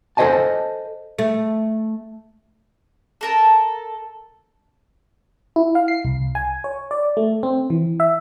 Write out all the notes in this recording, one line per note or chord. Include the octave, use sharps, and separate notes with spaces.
A4 C5 C#5 D#5 G#5 A5
A3
A4 A#4 A5
E4
F5
C7
C2
G#5
C#5
D5
A3
C4
E3
E5